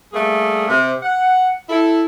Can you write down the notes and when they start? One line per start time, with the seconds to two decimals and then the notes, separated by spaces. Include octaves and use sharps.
0.13 G3 A3 A#3 G#4
0.68 C3
1.02 F#5
1.69 E4 A4